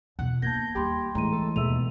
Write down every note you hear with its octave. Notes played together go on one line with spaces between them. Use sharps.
E2 B2 F#5
A#3 B3 D4 A5 G6 G#6 A#6
D#2 G3 G4 G5 B5 C6
A2 E3 G#3 A3 A#5 C6 D#7
A4
D#2 B2 G#3 D#5 E5 E6 D#7 F7